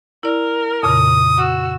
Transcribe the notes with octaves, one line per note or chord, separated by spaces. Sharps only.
E4 A#4 D5
F2 A#2 C#3 D#6
F#4 E6